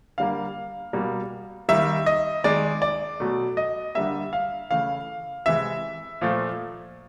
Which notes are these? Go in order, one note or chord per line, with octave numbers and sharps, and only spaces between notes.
D3 G3 A#3 F5
B2 G3 A#3
D#3 G3 A#3 E5
D#5
D#3 G#3 D5
D5
B2 F#3 A3
D#5
D3 G3 A#3 E5
F5
C#3 E3 A3 F5
C3 E3 G#3 E5
A#2 F3 A3